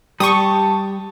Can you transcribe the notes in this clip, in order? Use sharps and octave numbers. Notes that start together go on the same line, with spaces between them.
G3 G4 A5 C#6 D#6